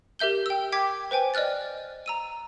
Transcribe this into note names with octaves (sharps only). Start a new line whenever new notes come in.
G4 A#4 E5 G6 G7
G5 E6
G5 D6 G#6 B6
B4 C5 G5 G#5
D5 D#5 F6 F#6 A6
A#5 E6 D#7